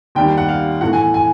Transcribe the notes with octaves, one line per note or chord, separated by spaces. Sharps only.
D#2 D#3 G3 G5
F#5
F5
A2 E3 A3 F#5
G#5
G#5